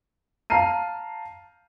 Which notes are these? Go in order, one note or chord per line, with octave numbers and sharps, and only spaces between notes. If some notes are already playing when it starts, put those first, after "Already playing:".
F5 A5 A#5 F6 C7 D#7